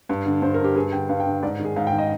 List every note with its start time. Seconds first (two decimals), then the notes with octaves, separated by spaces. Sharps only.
0.09 G2
0.26 D3
0.42 G2 C5
0.54 A#4
0.60 D3 G4
0.76 G2 G#4
0.92 D3 G5
1.09 G2 F5
1.20 G5
1.27 D3
1.42 G#2 D5
1.59 D#3
1.65 G#4
1.76 G#2 F5
1.87 G5
1.92 D#3
1.98 D#5